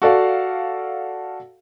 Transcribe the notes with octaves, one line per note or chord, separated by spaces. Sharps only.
F#4 A4 D5 F5